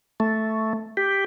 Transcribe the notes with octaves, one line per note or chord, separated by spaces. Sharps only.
A3
G4